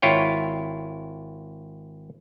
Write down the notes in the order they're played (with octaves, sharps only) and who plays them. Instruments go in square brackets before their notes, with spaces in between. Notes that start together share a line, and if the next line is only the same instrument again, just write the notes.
[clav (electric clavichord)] G#1 E4 F4 C#5 G5